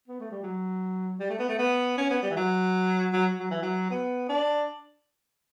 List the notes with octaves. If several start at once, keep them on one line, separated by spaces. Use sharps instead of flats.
B3
A3
G3
F#3
G3
A3
B3
A3
B3
C#4
B3
G3
E3
F#3
F#3
F#3
E3
F#3
B3
D4